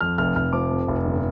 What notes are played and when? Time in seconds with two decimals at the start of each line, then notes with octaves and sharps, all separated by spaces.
0.01 F2 F6
0.18 F1 F6
0.36 F1 F6
0.53 F3 D6
0.71 F2
0.88 F1
1.05 G1